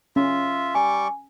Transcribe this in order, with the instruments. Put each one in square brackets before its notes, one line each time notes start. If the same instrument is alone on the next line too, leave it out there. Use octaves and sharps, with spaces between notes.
[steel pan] C#4 [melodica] F4 E5
[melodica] G3 C#6 D6 [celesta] G#5